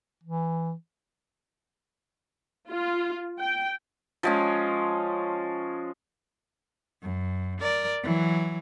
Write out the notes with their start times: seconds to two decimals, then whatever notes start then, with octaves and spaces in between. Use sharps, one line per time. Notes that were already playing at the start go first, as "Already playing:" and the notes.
0.24 E3
2.70 F4
3.39 G5
4.23 F3 G#3 C#4
7.02 F#2
7.61 A#4 D5
8.03 E3 F#3